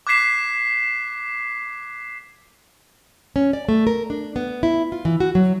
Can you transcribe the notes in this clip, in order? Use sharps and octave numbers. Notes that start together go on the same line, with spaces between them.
D6 F#6 G#6 B6 C7 E7
C#4
D5
A3
A#4
D4
B3
E4
F4
E3
F#4
F#3